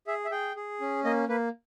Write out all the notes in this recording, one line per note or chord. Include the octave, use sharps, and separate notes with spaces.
G#4 E5
E5
G#4 G5
G#4
C#4
A#3 D#5
A#3 B4